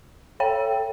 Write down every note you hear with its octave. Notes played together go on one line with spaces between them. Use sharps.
A4 C#5 G5